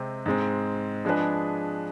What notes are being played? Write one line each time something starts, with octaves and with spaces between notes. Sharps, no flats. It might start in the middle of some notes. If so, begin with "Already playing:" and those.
Already playing: C3 G#3 C4
G#2 G#3 C4
F3 G#3 D4 G#4 B4